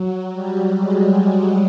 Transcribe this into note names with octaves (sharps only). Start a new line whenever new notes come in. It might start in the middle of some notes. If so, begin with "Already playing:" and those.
Already playing: F#3
G3
G#3